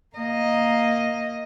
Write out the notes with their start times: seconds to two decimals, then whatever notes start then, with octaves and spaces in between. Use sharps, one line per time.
0.16 A#3 D#5